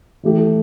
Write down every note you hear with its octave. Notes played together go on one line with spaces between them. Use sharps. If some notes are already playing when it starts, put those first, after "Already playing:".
E3 A3 G4